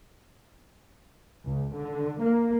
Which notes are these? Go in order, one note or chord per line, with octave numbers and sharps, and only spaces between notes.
C#2
D3
A#3